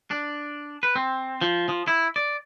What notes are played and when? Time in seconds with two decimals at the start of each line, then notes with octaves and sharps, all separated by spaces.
0.11 D4
0.83 B4
0.96 C4
1.42 F3
1.69 F3
1.88 E4
2.16 D5